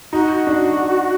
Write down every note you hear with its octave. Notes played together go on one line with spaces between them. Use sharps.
D#4 F#4
D4